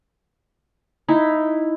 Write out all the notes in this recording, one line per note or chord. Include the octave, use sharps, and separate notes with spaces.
D#4 E4